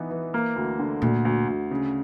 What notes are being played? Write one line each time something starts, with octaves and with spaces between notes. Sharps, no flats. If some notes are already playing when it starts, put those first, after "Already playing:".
Already playing: E3 B3 D#4
E3
A#3
D2
D3
D2 A#2
D2
D2
C#3